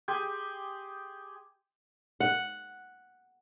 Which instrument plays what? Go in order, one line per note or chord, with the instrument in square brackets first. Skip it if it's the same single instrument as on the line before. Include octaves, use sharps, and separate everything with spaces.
[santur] G4 G#4 G#5 C6
[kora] F#5